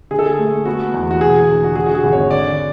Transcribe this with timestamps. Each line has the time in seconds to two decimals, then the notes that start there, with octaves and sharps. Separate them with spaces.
0.11 D3 G#4
0.19 A4
0.26 G#4
0.38 A3
0.65 B3 F#4
0.94 E2
1.11 F#4
1.21 E1 G#4
1.49 D3
1.64 F#4
1.75 D3 G#4
1.86 F#4
1.94 G#4
2.03 G#1
2.13 C#5
2.31 D3 D5